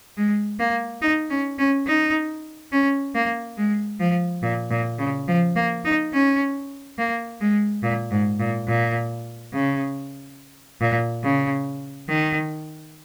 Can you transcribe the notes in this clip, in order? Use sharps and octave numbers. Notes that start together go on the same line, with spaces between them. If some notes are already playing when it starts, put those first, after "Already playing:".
G#3
A#3
D#4
C#4
C#4
D#4
C#4
A#3
G#3
F3
A#2
A#2
C#3
F3
A#3
D#4
C#4
A#3
G#3
A#2
G#2
A#2
A#2
C#3
A#2
C#3
D#3